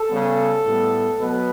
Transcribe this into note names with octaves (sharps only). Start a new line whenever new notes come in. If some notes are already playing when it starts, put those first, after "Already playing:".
Already playing: A4
C#3 G3 B3
A2 G3 B3
B2 F#3 B3 B4